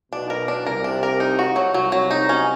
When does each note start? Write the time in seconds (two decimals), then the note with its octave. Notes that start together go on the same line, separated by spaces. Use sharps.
0.12 B1 B2 D4
0.30 A#4
0.48 D4
0.66 C2 C3 A#4
0.84 D4
1.03 A#4
1.20 D#4
1.39 F#4
1.56 F#3
1.74 C2 C3 F#3
1.92 F#3
2.11 D#4
2.29 C#4